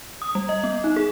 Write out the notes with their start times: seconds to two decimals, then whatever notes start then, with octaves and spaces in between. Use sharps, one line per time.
0.22 D#6
0.35 G3
0.49 D#5
0.64 B3
0.84 D#4
0.96 G#4